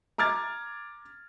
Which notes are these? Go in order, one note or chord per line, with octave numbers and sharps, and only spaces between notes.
A#5 D6 F6 G#6 A6